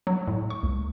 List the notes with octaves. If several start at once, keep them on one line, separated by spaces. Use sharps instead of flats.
F#3
A2
C#6
C#2